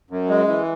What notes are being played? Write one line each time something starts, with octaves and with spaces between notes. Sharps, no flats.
F#2
G#3
E3